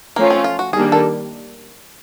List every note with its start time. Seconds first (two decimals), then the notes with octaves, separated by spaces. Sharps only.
0.16 F3 A3 A#3 C#4 F4
0.30 C4
0.44 F4
0.59 F#4
0.73 D#3 G3 A#3 D4 G#4
0.92 A4